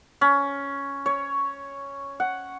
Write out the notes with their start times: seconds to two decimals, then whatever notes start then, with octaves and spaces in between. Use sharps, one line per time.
0.21 C#4
1.06 C#5
2.20 F#5